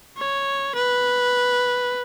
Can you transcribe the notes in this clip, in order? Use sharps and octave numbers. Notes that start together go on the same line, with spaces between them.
C#5
B4